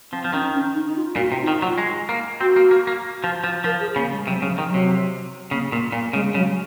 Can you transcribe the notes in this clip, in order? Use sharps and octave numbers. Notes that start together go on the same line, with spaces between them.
F3 C4
F3
D#3 C#4
C#4
D#4
D#4
F4
A#2 F#4
C3 F4
D#4
D#3
F4
F#3
G#3
A#3
C4 F#4
A#3
A#3
A#3
F3
F3
F3 A#4
G#4
C#3 A#3
G#3
C3 F#3
C#3
F3
D#3
F#3
C3
C#3 A#3
A#2 A#3
A#2 A#3
C#3 G#3
C#3 F#3